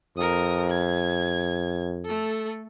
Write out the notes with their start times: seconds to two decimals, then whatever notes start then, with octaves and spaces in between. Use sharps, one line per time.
0.17 F2 A#4 D#6
0.70 G#6
2.05 A3 A4